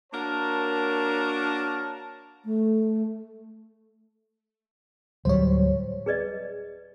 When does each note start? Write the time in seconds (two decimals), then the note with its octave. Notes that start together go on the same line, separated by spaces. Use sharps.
0.13 A#3 D4 F#4 A#4 C#5 A5
2.45 A3
5.25 D1 F#3 G3 C5 C#5
6.06 G#4 B4 D5 D#5